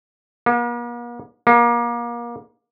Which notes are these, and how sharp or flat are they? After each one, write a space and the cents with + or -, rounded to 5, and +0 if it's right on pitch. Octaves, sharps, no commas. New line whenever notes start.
A#3 +45
A#3 +30